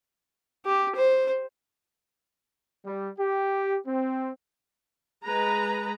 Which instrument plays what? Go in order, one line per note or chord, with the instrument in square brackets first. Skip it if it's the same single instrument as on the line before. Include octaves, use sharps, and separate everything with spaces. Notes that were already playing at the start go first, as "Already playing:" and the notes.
[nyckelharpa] G4
C5
[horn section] G3
G4
C4
[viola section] G#3 B4 A#5